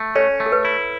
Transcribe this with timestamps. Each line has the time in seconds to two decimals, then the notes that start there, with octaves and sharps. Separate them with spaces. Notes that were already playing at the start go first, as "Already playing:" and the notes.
Already playing: A3
0.16 C#4 A4 C#5
0.40 A3
0.46 A4
0.52 B4
0.65 E4